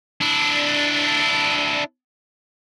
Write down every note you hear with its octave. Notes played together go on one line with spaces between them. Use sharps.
D4 E4